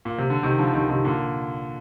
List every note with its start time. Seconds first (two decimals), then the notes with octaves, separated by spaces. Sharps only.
0.05 A#2
0.18 C3
0.30 D3
0.43 C3 D#3
0.58 D3 F3
0.73 C3 D#3
0.89 C3 D#3
1.04 A#2 D3